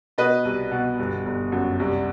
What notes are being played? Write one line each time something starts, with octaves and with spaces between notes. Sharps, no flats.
B2 B4 D#5
C2
B2
G1
G1
F#2
C2